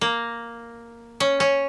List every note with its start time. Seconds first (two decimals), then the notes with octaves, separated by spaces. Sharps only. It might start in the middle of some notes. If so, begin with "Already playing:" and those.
0.01 A#3
1.20 C#4
1.40 C#4